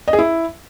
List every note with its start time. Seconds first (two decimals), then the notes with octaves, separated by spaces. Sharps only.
0.08 D#5
0.13 G#4
0.19 E4